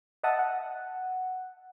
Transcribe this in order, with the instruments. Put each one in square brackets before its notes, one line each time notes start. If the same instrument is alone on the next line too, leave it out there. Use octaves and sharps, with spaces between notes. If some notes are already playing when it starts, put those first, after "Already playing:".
[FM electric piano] D#5 E5 F#5 A5 D#6
F#5